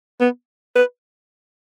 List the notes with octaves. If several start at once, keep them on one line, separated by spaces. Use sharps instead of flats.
B3
B4